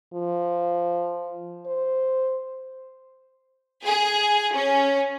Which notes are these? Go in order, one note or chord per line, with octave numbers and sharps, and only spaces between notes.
F3
C5
G#4
C#4